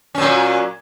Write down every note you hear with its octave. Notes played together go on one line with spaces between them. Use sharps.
A#2 F#3 C#4